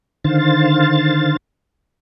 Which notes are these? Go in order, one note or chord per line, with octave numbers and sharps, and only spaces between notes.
D3 D#3 C5 F5 A6